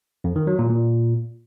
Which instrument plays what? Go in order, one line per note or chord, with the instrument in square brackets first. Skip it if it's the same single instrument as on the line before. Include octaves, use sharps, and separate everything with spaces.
[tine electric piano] F2
D#3
F#3
A#2
A#2